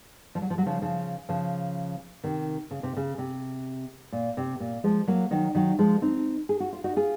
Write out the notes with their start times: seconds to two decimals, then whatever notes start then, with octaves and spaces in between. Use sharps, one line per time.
0.35 F3
0.42 F#3
0.50 F3
0.58 F#3
0.66 C#3 F3
0.82 C#3 F3
1.29 C#3 F3
2.24 C3 D#3
2.71 C#3
2.83 C3
2.97 C#3
3.18 C3
4.12 A#2
4.37 C3
4.60 A#2
4.84 F3 G#3
5.08 F#3 A#3
5.31 D#3 F#3
5.55 D#3 F#3
5.79 F3 G#3
6.02 C4 D#4
6.49 G#4
6.60 F#4
6.73 F4
6.84 D#4 F#4
6.96 F4 G#4